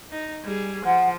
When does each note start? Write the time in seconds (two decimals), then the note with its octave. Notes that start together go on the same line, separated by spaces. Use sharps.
0.11 D#4
0.45 G3 G#4
0.86 F3 F#5